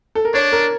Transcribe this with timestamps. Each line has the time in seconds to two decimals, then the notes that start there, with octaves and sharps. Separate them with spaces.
0.15 A4
0.25 A#4
0.34 D4 C#5
0.52 A#4